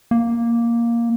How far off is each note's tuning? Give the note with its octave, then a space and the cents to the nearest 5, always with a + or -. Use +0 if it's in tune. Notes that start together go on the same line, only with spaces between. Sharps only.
A#3 +5